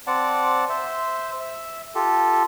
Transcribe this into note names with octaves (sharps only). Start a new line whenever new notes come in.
C4 D5 F#5 A5
C5 E5
E5
F4 G4 A4